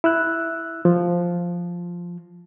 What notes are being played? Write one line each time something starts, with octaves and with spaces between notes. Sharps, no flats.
E4 E6 F#6
F3